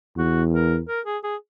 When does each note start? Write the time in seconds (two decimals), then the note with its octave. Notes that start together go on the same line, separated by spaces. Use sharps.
0.17 E2 F#4
0.52 A#4
0.88 A#4
1.05 G#4
1.23 G#4